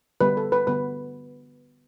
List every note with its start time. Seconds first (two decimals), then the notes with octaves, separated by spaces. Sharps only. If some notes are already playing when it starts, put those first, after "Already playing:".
0.21 D3 G3 B3 B4
0.37 A4
0.52 B4
0.67 D3 G3 B3 B4